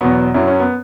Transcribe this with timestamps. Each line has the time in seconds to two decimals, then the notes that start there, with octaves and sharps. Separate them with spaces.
0.01 E2 B2 F#3 B3
0.34 F#2 F#3 E4
0.48 C#4
0.60 B3